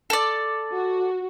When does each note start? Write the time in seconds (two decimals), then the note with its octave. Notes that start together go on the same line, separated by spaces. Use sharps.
0.10 A4 D5
0.73 F#4